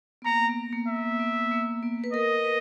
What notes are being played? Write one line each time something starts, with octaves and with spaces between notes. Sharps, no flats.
B3
A#3 A#5
B3
A#3
E5
B3
B3
A#3
B3
B4
A#4 D#5
B4